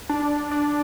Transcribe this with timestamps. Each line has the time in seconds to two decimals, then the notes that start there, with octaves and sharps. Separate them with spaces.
0.09 D4
0.51 D4